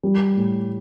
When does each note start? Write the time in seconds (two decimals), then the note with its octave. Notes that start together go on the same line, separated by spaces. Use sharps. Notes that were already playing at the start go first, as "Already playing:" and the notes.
0.03 G3
0.37 A2